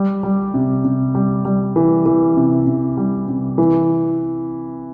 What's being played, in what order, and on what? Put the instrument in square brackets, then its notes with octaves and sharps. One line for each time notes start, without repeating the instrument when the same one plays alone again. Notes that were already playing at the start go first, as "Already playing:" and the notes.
Already playing: [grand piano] G3
G3
C3
C3
G3
G3
E3
E3
C3
C3
G3
C3
E3